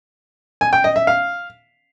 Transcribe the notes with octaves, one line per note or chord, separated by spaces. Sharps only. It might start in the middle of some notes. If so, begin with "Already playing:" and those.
G#5
G5
D#5
E5
F5